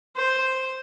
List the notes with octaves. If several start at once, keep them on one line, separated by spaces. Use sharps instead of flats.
C5